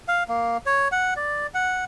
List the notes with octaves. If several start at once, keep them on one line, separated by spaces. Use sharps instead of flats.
F5
A#3
C#5
F#5
D5
F#5